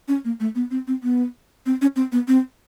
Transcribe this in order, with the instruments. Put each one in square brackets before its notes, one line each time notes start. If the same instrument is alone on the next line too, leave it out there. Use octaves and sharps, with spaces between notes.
[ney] C#4
A#3
A3
B3
C4
C4
B3
C4
C#4
C4
B3
C4